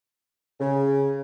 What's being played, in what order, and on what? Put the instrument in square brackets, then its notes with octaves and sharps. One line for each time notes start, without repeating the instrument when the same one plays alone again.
[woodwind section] C#3